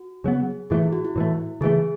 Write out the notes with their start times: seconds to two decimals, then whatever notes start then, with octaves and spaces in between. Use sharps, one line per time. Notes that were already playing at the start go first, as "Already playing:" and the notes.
Already playing: F#4
0.24 C#3 F#3 B3 G#4
0.70 A2 E3 A3 G#4
0.83 E4
0.93 F#4
1.05 E4
1.16 A2 E3 A3
1.61 C#3 E3 A3 G#4